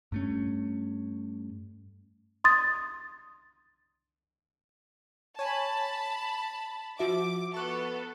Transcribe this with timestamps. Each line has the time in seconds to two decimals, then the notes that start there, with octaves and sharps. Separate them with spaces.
0.12 G2 A3 C#4
2.44 C6 D#6 A6
5.39 C#5 G#5 A5 B5
6.99 F3 F#4 E5 D6
7.54 B3 A4 C#6 F#6